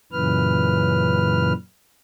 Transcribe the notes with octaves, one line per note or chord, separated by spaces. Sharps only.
F#2 A#2 C#3 E3 B4 F6